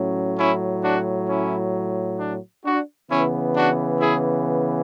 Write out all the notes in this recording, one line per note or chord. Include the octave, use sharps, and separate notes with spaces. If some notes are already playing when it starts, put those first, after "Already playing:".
Already playing: A2 F#3 C#4
C#4 E4
D4 F#4
C#4 E4
D4
D4 F#4
C#3 E3 B3 C#4 E4
D4 F#4
E4 G#4